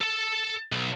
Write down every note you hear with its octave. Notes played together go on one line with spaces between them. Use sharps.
A4 A5
B1